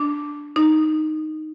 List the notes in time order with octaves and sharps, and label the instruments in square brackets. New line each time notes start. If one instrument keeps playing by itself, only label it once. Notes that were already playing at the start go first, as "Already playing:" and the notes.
Already playing: [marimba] D4
D#4